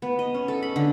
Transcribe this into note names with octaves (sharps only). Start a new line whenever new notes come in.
B3
D#5
C#4
A4
B5
D3